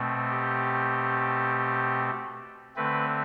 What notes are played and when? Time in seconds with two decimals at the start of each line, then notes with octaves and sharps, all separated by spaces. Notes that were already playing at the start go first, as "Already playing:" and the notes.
Already playing: B2 A3 C4
0.30 G4
2.76 D3 A3 C4 B4